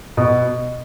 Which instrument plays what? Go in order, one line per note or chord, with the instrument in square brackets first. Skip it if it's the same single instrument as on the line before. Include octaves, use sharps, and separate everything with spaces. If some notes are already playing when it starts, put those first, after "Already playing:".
[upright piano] B2